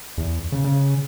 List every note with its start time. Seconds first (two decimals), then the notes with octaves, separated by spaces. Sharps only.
0.18 E2
0.52 C#3
0.64 C#3